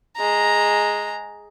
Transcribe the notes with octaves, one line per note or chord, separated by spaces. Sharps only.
G#3 A#5